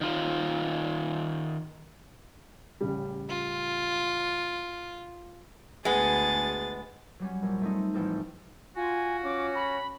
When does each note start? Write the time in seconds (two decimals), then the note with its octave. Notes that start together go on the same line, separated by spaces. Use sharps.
0.01 D#3 F4
2.81 A1 C#3 G3
3.29 F4
5.85 D2 G#3 B3 G#4 A6
7.19 F#3 G3 C#4
7.42 A#1
7.62 A3 C4 D#4
7.94 A1 F3 A4 G5
8.76 F4 F#4 G#5
9.24 C#4 D6
9.55 B5